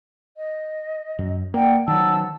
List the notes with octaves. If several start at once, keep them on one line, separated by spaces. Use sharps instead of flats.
D#5
F#2
A#3 D5 F#5 G5
D#3 F#3 F#5 A5 E6